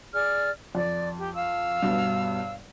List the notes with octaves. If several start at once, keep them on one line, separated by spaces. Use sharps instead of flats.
G#4 D5 F6
F2 D5
G4
F5 E6
G1 G2 B2